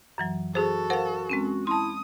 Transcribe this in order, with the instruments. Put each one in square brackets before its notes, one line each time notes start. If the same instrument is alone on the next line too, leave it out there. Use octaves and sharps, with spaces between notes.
[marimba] F#2 E3 F#3
[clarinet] F#4 [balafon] G#4 C5 [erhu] A4
[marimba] A#4 F5 [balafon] C5 F#5
[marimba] G#3 C4 C#4
[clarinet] E4 [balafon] A5 C6 [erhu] D#6